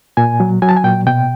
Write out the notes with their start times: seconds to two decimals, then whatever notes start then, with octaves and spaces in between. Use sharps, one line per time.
0.17 A#2 G#5
0.40 F#3
0.62 F#3 G#5
0.69 A5
0.77 G#5
0.84 A#2 G5
1.07 B2 G5